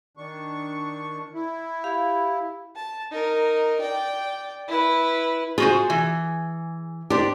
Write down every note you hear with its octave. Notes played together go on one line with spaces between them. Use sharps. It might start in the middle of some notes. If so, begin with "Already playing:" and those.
D#3 D4 C#6
E4
G4 F5 B5
A5
D#4 A#4
D5 G5
E4 B4
F4 F#4 G#4 C5
E3
D4 G4 C5